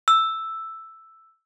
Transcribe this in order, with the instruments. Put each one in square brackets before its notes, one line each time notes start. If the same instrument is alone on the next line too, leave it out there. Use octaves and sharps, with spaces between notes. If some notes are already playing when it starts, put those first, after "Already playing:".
[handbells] E6